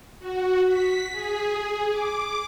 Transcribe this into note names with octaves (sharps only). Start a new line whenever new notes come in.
F#4
B6
G#4
D6